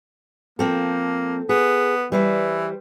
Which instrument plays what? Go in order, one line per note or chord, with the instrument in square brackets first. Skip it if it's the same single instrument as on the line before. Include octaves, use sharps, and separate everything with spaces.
[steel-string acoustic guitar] F3 C4 A4 [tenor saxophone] A#3
[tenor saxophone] B3 [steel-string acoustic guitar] G#4
[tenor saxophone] E3 [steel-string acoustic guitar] G3 B4 C5